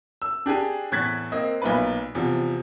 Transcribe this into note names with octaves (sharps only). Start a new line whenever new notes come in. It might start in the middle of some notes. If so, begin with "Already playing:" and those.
E6
D4 G4 G#4 G#5
E2 A2 F#6 G#6 A6 B6
A#3 C4 D#5
B1 A#2 B4
E2 C3 F3